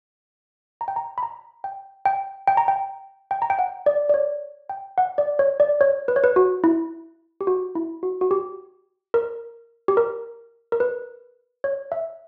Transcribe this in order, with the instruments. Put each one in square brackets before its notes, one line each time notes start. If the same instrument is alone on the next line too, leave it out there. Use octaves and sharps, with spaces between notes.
[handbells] A#5
G5
A#5
B5
A#5
G5
G5
G5
A#5
G5
G5
A#5
G5
F#5
D5
D5
C#5
G5
F#5
D5
C#5
D5
C#5
B4
C#5
B4
F#4
E4
G4
F#4
E4
F#4
F#4
G4
A#4
G4
A#4
A#4
B4
C#5
E5